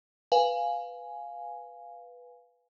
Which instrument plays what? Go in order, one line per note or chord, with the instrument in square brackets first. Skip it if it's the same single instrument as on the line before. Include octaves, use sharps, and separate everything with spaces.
[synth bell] B4 F5 G#5